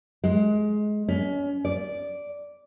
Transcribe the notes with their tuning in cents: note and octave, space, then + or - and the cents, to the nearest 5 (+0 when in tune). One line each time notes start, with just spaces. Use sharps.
G#3 +20
C#4 +35
D5 -10